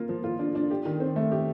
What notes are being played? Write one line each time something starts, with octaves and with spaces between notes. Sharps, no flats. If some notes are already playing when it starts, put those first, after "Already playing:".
Already playing: A#3 F4
F3
F4
D4
D4
G4
D#3
C4
A3
G4